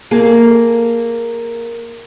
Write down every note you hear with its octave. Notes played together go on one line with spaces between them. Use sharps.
A#3 G#4